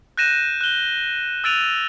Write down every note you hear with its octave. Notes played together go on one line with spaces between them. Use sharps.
F#6 G6 A#6 D#7 E7
F#6 G7
E6 F#6 A6 D7 D#7 F7